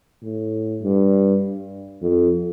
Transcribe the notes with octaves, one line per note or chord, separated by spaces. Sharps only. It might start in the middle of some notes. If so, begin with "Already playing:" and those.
A2
G2
F2